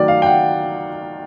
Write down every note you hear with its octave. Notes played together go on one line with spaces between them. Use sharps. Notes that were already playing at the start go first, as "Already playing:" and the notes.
Already playing: D#3 F#3 A3 D5
F5
G5
F#5